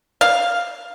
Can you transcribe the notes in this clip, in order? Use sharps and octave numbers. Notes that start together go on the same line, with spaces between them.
F5